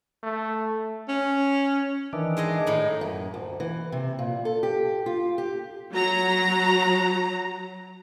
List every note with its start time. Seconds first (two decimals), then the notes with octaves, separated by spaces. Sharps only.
0.23 A3
1.08 C#4
2.13 D#3 E3 D4
2.37 G#3 G#4 D#5
2.67 A2 D#4
3.01 F#2
3.34 D2
3.60 E3
3.92 C3
4.19 A#2
4.45 A4
4.63 G4
5.06 F4
5.38 G4
5.93 F#3 A#5